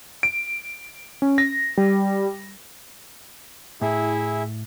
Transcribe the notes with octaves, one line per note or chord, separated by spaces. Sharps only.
D7
C#4
A#6
G3
A2 E4 G#4 E5